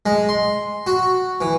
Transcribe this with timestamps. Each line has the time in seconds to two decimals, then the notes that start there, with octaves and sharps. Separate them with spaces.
0.06 G#3
0.29 C6
0.87 F#4
1.41 E3